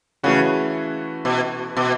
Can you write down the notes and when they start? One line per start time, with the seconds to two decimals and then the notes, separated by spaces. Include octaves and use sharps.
0.23 C#3 E3 A3 C#4 F#4
1.25 B2
1.77 B2